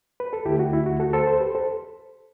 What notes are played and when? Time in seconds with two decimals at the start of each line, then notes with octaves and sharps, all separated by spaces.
0.20 B4
0.33 A4
0.45 D2 D3 A3 E4 G4
0.59 F#4
0.73 E4
0.86 F#4
1.00 F#4 A4
1.13 A4 C5
1.27 A4 C5
1.40 G4 B4
1.55 A4 C5